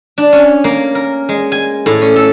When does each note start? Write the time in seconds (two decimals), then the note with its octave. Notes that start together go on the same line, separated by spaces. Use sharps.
0.18 D4
0.33 C#4
0.64 A#3
0.95 A#4
1.29 G#3
1.52 G#5
1.86 A2
2.02 C#4
2.16 A4